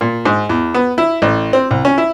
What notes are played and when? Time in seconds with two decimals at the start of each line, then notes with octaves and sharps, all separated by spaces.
0.01 A#2
0.25 G#2
0.49 E2
0.74 B3
0.98 E4
1.22 A1
1.53 C4
1.71 C2
1.85 C#4
1.98 E4